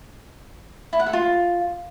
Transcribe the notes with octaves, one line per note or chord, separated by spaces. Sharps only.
E4
F#5
A4
F4